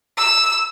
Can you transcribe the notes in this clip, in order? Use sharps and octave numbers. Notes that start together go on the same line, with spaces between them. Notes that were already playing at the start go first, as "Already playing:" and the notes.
E6